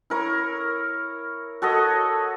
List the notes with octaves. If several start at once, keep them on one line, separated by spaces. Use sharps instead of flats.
E4 A#4 C#5
F#4 A4 C#5 D#5